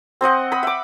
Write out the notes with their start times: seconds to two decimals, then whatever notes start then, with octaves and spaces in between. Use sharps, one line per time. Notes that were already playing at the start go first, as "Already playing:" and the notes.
0.21 C4 C5 D#5 F#5
0.52 D#5 B5
0.63 E5 D6